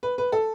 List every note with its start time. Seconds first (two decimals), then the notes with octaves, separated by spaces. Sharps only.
0.03 B4
0.18 B4
0.32 A4